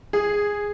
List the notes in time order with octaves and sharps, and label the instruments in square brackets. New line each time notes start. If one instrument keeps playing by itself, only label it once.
[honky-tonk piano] G#4